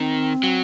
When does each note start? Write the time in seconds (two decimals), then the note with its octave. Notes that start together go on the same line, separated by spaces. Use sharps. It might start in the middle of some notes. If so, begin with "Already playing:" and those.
Already playing: D#3 C4
0.43 F#3